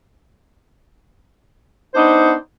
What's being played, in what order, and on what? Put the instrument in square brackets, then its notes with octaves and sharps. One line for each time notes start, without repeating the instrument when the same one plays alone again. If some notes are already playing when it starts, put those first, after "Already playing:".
[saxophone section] B3 D4 D#4 C5